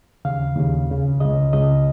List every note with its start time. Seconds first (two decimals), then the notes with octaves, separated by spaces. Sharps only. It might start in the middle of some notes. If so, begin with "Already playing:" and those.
0.25 D#2 C#3 F5
0.56 D#2 C#3
0.89 C#2 C#3
1.20 C#2 C#3 D#5
1.53 C#2 C#3 D#5